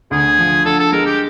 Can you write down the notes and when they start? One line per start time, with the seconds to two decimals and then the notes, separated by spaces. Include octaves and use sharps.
0.11 D2 G#4
0.39 F3
0.65 D3 A4
0.79 A4
0.92 G#3 A#4
1.06 G4